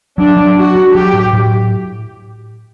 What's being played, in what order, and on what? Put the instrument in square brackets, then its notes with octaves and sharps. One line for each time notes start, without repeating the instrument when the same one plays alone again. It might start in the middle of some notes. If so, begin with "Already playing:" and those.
[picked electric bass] F#3 [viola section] D4
[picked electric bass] F#3
[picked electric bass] D4 [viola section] F#4
[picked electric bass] D4
[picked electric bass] F#3 [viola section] G4
[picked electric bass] A2
A2